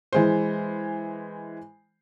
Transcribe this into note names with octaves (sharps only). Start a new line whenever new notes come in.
E3 G#3 C5